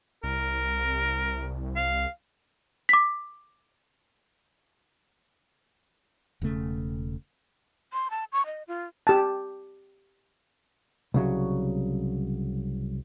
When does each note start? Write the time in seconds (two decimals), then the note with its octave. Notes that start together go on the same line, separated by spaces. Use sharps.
0.24 C2 A#4
1.76 F5
2.89 D6 B6
6.42 E1 C#3 A3
7.93 C6
8.11 A5
8.32 C#6
8.46 D#5
8.68 F4
9.07 G4 A5
11.14 C2 C#3 F#3